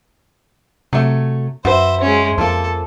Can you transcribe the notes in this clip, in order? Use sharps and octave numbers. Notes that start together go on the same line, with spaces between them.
C3 F#3 A3
F#2 F#4 B4 C5 E5
G#3 C#4
F2 F3 A#3 A4